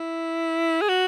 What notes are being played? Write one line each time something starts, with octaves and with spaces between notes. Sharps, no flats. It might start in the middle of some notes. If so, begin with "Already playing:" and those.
Already playing: E4
G#4
F#4